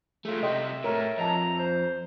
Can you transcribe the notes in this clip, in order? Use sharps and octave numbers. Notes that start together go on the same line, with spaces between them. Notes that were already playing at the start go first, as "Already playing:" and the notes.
A3 F4 G#4 E5
C3 G3 D#5 G5 C6
A2 A#4 C#5
F2 D#5 E5 A5 A#5
C5